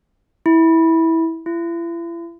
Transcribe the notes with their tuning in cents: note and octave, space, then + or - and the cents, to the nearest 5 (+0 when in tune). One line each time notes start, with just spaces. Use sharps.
E4 -15
E4 +40